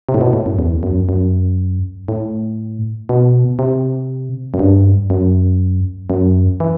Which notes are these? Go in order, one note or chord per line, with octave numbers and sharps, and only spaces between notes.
C3
A2
B2
A2
F#2
E2
F#2
F#2
A2
B2
C3
F#2
G2
F#2
F#2
E3